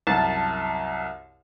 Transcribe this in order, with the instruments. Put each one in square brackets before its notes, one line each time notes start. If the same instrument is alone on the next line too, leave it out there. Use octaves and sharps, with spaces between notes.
[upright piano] C2 F#2 [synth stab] A5